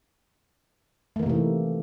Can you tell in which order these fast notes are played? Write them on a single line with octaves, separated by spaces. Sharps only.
A3 D#3 A#3 C3 E3